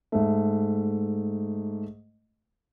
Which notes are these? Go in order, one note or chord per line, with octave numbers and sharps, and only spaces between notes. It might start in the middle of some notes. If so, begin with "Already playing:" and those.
G#2 A3